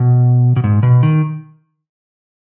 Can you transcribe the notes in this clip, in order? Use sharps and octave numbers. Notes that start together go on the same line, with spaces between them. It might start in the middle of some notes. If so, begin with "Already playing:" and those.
Already playing: B2
B2
G#2
B2
D#3